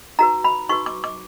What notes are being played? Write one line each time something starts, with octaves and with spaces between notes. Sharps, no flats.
D#4 F#4 B4 A#5
B5
D#4 F#4 B4 C#6
D6
D6